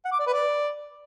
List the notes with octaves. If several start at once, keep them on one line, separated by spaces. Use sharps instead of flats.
F#5
D6
D5
B4
D5